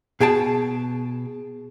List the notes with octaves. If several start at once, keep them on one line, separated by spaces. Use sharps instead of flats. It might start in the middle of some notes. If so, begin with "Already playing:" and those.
B2 G#4 G5 A5